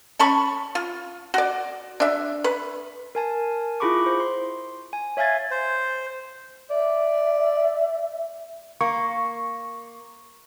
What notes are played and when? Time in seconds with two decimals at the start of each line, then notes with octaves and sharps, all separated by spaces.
0.19 C#4 A5 B5 C#6
0.75 F4
1.34 F#4 D5
2.00 D4 E5
2.44 B4
3.15 A#4 G#5 A5
3.80 E4 F4 G#4 B5 C#6 D6
4.06 C5
4.20 C6
4.93 G#5
5.17 C#5 E5 F5 G#5 G#6 A6
5.51 C5
6.70 D5 E5
8.81 A#3 C#6